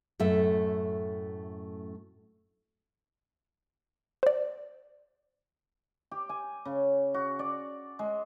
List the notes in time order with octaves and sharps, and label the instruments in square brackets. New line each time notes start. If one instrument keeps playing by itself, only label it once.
[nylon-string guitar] F#2 A2 A3 E5
[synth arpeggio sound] C5 D5
[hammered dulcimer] G4
G#5
C#3
F#4
D5
G#3